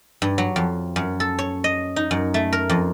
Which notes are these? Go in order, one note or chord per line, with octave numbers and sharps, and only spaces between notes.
G2
F#3
F2
F#2
A4
C#5
D#5
D#4
F#2
A3
A#4
F2